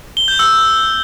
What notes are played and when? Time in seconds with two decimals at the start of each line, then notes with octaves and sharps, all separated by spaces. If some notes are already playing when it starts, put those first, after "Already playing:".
0.17 G7
0.28 G6
0.39 E6